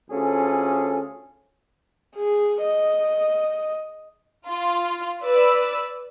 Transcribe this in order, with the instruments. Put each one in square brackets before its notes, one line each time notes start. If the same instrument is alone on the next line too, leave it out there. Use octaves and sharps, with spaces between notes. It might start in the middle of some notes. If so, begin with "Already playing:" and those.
[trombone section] D2 C#4 F4 G#4 A4
[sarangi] G#4
D#5
[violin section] F4
B4 D5 E6